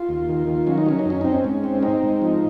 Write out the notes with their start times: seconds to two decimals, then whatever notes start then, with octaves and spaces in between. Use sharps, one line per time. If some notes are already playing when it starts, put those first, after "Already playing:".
Already playing: F4
0.09 D#2
0.29 D#3
0.47 D#3
0.67 F#3 C#4
0.78 D#4
0.86 F#3 C#4
0.99 D#4
1.05 F#2 C#4
1.21 C4 D#4
1.32 C#4
1.44 G#2
1.64 C4
1.83 C4 D#4
2.03 G#2
2.22 F3